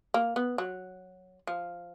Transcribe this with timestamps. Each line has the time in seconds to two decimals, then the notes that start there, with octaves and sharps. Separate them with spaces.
0.14 A#3
0.36 B3
0.58 F#3
1.47 F3